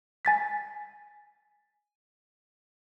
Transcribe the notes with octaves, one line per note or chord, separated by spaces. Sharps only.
G#5 A6 B6